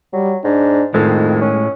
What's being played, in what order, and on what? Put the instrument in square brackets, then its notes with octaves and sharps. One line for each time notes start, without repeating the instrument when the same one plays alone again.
[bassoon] F#3 [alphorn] G3
[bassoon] G#2 [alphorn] D4
[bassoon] F2 [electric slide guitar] A2 G#3 [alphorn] D#3
[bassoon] C#4